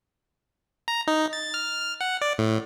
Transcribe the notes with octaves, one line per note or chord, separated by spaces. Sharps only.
A#5
D#4
A6
F6
F6
F#5
D5
A2